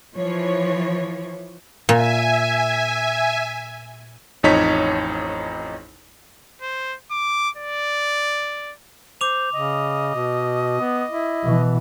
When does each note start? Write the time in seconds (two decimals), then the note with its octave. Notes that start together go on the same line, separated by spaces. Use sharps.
0.16 E3 F3 C#5
1.89 A#2 E5 G#5
4.43 A1 F2 D#4 C#5 B6
6.62 C5
7.11 D6
7.57 D5
9.21 C5 D6 F7
9.53 C#3 D#5
10.15 B2
10.80 B3
11.11 E4
11.44 B2 E3